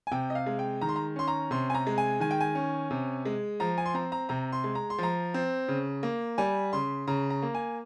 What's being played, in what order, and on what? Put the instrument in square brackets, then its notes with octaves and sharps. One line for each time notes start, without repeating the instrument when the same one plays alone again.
[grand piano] G#5
C3 G5
D#5
F5
G#3
G5
D#3 A#5
C6
A#5
C#4 C6
A#5
C3 C6
G#5
A#5
G#3
G#5
D#3 G#5
G5
G#5
C#4
C3
G#3
F3 A#5
G#5
C6
C4 A#5
A#5
C3 A#5
C6
G#3
A#5
C6
F3 A#5
C4
C#3
A#3
G3 G#5
C#3 C6
C#3 A#5
A#5
A#3
G#5